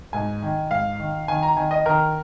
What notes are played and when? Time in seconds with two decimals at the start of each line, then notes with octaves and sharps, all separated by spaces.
0.13 G#2 G#5
0.42 D#3
0.70 G#2 F5
1.00 D#3
1.28 D#3 G#5
1.43 A#5
1.56 D#3 G#5
1.71 D#5
1.85 D#3 A#4